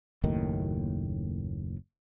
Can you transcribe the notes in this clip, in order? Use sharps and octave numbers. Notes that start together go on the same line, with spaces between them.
F#1 D#2 A2 D#3